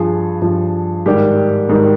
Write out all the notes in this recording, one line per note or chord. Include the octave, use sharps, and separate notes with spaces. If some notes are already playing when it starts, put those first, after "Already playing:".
Already playing: G2 F3 G#4
G2 F3
G#2 D#3 G3 G4
G#2 D#3 G3